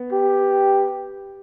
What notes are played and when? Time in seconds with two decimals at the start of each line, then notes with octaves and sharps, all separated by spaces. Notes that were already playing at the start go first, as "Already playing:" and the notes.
Already playing: B3
0.13 G4